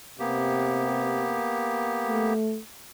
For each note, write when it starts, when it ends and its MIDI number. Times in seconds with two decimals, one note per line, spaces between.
0.20 1.43 48
0.20 2.33 58
0.20 2.33 59
0.20 2.33 67
2.07 2.59 57